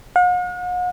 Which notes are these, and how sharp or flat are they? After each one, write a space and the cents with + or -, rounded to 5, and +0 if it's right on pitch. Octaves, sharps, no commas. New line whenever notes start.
F#5 -45